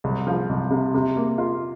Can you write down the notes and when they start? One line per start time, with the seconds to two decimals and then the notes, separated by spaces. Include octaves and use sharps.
0.04 C2
0.27 F3
0.49 C2
0.71 C3
0.94 C3
1.17 A#3
1.38 F4